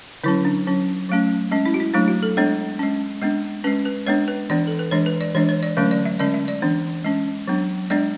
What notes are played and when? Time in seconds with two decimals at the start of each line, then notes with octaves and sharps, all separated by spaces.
0.24 D3 F#3 C#4 E4
0.45 D4
0.67 F#3 C#4
1.09 F#3 A3 C#4
1.51 G#3 C#4
1.66 E4
1.74 F#4
1.80 E4
1.94 F#3 A3 D4 E4
2.08 F#4
2.23 A4
2.37 G#3 B3 D4 C#5
2.79 G#3 C#4
3.22 G#3 B3 D4
3.64 C#4 B4
3.67 G#3
3.85 B4
4.06 G#3 B3 D4 C#5
4.28 B4
4.50 E3 B3 D4 D5
4.67 A4
4.79 B4
4.91 E3 G#3 D4 C#5
5.06 B4
5.21 D5
5.35 E3 G#3 D4 C#5
5.49 C#5
5.63 D5
5.77 D3 F#3 A3 C#4 E5
5.91 D5
6.05 E5
6.19 D3 G#3 C#4 D5
6.34 E5
6.48 D5
6.62 E3 B3 D4
7.04 G#3 C#4
7.48 F#3 B3 D4
7.90 G#3 B3 D4 D5